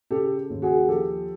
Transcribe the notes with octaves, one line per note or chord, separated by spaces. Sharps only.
C#3 G4 A4
D#2
F#4 G#4
F3 G4 A4